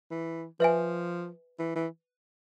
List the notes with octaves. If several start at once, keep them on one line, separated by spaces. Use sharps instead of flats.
E3
F3 B4 E5 G#5
E3
E3